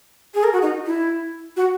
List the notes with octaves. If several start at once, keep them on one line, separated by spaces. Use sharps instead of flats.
G#4
A#4
F#4
D#4
E4
F#4